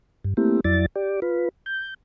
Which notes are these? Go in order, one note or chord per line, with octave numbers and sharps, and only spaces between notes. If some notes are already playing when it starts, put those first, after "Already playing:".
G2
A3 A#3 C4 E4 G4
F2 F#3 E4 D5 A6
G4 D5
F4 B4
G6